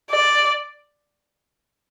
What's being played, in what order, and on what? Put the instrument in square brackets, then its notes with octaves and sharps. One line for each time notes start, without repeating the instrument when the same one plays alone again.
[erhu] D5